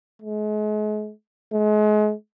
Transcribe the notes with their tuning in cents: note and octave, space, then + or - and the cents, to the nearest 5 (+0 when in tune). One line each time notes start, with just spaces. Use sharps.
G#3 +40
G#3 +35